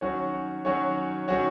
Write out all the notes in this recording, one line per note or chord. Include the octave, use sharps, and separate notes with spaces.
D#3 F#3 C#4 F#4 C#5
D#3 F#3 C#4 F#4 C#5
D#3 F#3 C#4 F#4 C#5